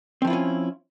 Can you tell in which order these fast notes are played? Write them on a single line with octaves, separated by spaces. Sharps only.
C4 F3 E4 F4 C#4